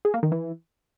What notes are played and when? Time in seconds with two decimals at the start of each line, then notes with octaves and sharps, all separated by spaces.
0.05 G#4
0.14 A#3
0.23 D#3
0.32 E3